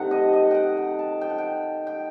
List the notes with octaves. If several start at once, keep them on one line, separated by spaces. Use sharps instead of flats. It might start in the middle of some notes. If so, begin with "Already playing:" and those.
Already playing: C3 D#3 A3 D#4 F#5
D#5
D#5
F#5 G5
G5
A5
G5
F#5
G5
G5